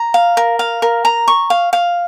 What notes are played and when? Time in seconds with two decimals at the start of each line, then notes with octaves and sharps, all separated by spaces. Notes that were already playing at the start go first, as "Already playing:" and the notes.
Already playing: A#5
0.14 F5
0.37 A#4
0.59 F5
0.82 A#4
1.05 A#5
1.28 C#6
1.50 F5
1.73 F5